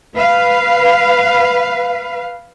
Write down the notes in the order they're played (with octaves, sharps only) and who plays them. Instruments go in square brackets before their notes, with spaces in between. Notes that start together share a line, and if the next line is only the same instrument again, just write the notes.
[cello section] B4 F5